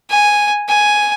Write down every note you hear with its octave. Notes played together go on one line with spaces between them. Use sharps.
G#5
G#5